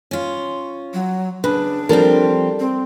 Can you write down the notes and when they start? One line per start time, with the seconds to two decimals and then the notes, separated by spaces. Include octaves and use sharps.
0.11 C#4 F4
0.94 F#3
1.44 C#3 D4 B4
1.89 F3 G3 C4 A4 A#4
2.60 C4